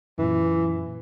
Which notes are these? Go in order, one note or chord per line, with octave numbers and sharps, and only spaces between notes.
F#2 A#2 E3